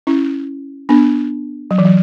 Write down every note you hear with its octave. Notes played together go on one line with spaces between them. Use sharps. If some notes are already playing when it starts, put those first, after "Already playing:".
C#4 E4
B3 D4
F#3
E3
F#3